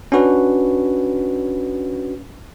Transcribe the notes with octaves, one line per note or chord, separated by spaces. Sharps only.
C#4 D4 F#4 B4